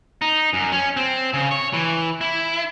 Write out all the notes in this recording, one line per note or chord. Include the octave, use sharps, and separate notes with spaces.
D#4
F#2
C#4
C4
C#3
C#5
E3
E4